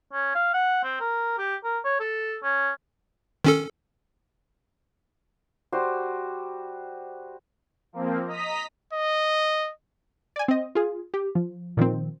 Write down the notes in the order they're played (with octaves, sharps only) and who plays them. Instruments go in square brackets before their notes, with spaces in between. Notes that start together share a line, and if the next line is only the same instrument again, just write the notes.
[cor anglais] C#4
F5
F#5
C4
A#4
G4
A#4
C#5
A4
C#4
[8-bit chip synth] D#3 C#4 A4
[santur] G3 F#4 C5 C6
[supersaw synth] F3 A#3 C4
D#5 A#5 D#6 B6
[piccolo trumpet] D#5
[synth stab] D5 G#5
C4 D#5
F4 G#4
G4
F3
A#2 D#3 F3 C4